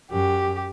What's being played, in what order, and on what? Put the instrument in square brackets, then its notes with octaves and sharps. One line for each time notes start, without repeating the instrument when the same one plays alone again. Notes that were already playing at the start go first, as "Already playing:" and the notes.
[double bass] F#2 [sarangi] G4